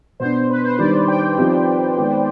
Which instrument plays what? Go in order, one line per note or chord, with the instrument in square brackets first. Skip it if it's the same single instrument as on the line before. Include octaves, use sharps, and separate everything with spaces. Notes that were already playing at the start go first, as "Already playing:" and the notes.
[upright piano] B2 B3 D4 [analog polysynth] C5
[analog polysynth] B4
C5
[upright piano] D#3 G3 D4 [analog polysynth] D5
[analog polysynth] G5
[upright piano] F3 C4 D#4 G4
D#3 G#3 B3